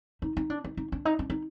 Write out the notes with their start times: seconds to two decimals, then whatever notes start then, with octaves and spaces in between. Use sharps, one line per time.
0.22 D#4
0.37 D#4
0.50 D4
0.64 D#4
0.77 D#4
0.92 D4
1.05 D#4
1.19 D4
1.30 D#4